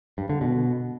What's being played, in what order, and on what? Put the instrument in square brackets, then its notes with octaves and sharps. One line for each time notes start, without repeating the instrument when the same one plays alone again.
[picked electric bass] G2
D3
B2